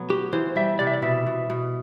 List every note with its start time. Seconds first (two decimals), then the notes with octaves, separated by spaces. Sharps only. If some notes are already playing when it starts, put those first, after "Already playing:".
Already playing: B2 F#3 A3 B3
0.09 F#4 G4
0.33 E3 C5
0.56 G3 E5
0.79 C3 D5
0.87 E5
0.93 D5
1.02 B2 E5
1.26 B2
1.50 B2